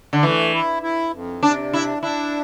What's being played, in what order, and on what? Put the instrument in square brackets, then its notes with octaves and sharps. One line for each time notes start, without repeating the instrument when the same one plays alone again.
[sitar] D3
[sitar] E3 [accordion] A3
[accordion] E4
E4
F2
[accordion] C3 [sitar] D4
[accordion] D4 [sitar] E4
[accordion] D4 [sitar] E4